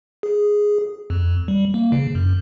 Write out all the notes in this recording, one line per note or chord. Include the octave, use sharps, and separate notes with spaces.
G#4
F2
G3
A#3
C#3
F#2